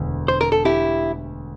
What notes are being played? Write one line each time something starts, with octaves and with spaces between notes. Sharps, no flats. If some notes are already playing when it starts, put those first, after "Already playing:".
Already playing: E1 D2
C5
A#4
A4
E4 G4